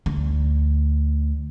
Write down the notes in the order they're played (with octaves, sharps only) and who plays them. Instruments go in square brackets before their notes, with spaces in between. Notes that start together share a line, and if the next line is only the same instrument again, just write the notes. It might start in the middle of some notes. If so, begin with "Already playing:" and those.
[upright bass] D2